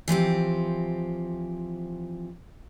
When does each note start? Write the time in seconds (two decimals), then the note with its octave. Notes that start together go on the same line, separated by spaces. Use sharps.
0.08 E3 F3 C4 G4